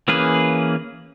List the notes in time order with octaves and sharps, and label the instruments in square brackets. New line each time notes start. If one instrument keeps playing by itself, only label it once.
[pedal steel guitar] E3 A#3 C#4 G#4 B4